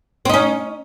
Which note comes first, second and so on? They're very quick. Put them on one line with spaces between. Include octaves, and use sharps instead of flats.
C4 D#4 C#4